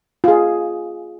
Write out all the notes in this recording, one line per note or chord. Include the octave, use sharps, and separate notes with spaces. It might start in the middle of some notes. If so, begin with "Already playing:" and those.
F4 G#4